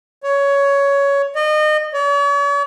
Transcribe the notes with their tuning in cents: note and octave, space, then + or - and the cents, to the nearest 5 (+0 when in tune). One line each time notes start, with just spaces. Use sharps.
C#5 +15
D#5 -30
C#5 +45